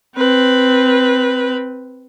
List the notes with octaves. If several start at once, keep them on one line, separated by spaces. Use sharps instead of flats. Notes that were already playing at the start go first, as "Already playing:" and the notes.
C4 B4